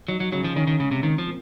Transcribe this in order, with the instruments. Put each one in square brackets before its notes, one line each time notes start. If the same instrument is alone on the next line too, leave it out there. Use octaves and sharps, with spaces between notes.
[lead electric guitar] F#3 [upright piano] D#4
[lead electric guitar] F#3
[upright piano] C#3 [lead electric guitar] F#3
[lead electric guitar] F3
[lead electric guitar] D#3 [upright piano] C#4
[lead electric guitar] D#3
[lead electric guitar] C#3 [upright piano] G#3
[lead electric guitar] C3
[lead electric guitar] D#3 [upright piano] C4
[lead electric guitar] F3
[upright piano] A#2